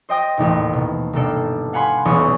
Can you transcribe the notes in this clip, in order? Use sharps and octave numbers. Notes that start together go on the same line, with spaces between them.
C5 D#5 G5 D#6 A#6
A1 D#2 A#2
B2
G1 B2 A#3 G4 A4 D5
F5 F#5 G#5 B5 C6
D#1 B1 E2 C#6 D#6